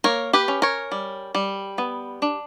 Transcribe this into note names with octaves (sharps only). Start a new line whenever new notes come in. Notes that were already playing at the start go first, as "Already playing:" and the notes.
A#3 A#4 C#5
G4 B4
C#4
A#4 C#5
G3
G3
B3
D4